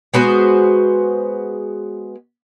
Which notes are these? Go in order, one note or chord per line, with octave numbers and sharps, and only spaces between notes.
G#3 B3 F#4 C5